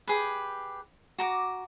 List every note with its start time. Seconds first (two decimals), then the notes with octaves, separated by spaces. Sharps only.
0.07 G4 G#4 B4
1.18 F#4 A#5 D6